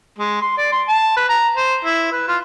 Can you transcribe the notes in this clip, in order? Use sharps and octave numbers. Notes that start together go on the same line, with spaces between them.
G#3
C6
D5
C6
A5
B4
A#5
C5
E4
B4
F4